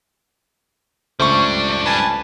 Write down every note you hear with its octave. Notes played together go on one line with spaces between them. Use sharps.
C#2 G3 A3 D4 C5 C#6
B4 G#5 A5